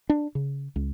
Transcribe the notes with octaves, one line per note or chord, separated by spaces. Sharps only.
D4
C#3
C#2